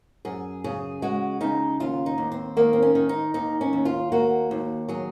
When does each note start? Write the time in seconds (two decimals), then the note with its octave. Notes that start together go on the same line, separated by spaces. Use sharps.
0.25 F#2 G#4
0.64 C#3 G#4
1.02 G#3 F#4
1.41 C#3 D#4
1.80 D#2 F4
2.06 D#4
2.18 D#2
2.32 C4
2.57 D#3 A#3
2.73 C4
2.82 C#4
2.95 D#3
3.09 D#4
3.34 D#2 D#4
3.61 C#4
3.73 D#2
3.85 F4
4.12 A#3 F#4
4.51 D#2
4.88 F#3 G#4